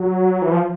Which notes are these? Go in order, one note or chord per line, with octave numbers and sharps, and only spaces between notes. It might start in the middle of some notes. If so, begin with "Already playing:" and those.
Already playing: F#3
E3
F3